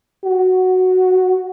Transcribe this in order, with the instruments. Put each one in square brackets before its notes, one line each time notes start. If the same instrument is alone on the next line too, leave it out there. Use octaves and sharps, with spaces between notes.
[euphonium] F#4